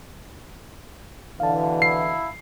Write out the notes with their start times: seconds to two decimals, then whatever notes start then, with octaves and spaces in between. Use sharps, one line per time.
1.40 B2 D3 E3 F5 A5
1.82 E4 C7